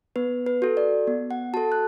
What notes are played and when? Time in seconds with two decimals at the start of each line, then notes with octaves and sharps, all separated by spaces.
0.16 B3 B4
0.46 B4
0.62 F#4 A4
0.77 D5
1.07 B3
1.31 F#5
1.54 F#4 A4 A5
1.72 F#6